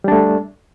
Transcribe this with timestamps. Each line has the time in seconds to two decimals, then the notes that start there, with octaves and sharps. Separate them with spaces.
0.04 G3
0.08 D4
0.12 A3